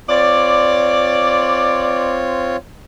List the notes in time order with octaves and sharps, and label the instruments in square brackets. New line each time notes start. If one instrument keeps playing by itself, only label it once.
[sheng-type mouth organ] C4 F4 C#5 [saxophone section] D5